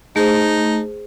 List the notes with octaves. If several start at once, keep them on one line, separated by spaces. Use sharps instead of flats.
A3 D#4 G#4 C5